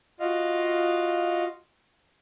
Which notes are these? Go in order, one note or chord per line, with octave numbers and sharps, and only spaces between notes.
F4 F#4 D#5 F5